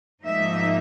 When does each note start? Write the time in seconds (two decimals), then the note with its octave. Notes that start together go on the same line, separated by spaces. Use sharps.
0.25 G#2 F3 A#3 D#4 E5